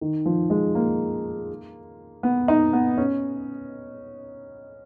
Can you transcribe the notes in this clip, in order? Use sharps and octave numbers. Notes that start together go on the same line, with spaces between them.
D#3
F3
G#3
A#3
B3
D#4
B3
C#4